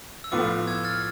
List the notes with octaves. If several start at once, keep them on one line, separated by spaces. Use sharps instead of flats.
E6
A2 F3 B3 F4 D6
E6 G#6
F6 A6